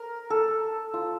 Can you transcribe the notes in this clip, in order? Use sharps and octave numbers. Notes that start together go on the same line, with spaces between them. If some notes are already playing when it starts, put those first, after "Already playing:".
Already playing: A#4
A4
F4